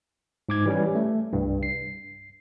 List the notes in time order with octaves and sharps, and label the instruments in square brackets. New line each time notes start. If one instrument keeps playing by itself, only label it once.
[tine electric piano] G#2 D6 G#6
E3 G3 C#4
A3
C2 G2
C7